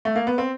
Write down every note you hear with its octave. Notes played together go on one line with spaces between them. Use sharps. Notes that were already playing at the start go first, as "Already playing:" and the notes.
A3
A#3
B3
C4